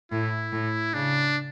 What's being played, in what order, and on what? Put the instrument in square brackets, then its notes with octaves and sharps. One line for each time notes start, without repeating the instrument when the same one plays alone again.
[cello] A2 [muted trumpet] E4
[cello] A2
[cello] C#3 [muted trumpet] D4